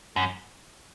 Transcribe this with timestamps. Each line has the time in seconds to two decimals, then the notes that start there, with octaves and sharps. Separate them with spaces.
0.16 F#2